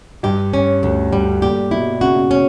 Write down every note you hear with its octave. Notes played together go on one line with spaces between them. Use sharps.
G2 G4
C#4
D2
G3
A#2 G4
B2 E4
C#3 F#4
B2
C#3
C#4